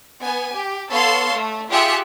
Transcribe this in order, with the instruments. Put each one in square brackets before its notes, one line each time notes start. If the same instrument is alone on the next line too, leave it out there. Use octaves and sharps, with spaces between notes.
[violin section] B3 G#5
G4
B3 A4 C#5 F5 A5 C6
A3
F4 G4 G#4 E5 F#6 C#7